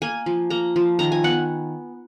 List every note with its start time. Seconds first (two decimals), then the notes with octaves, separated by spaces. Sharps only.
0.02 A#3 G#5
0.26 F3
0.50 A#3 A#5
0.76 F3
0.99 D#3 A#5
1.12 G#5
1.24 B3 F#5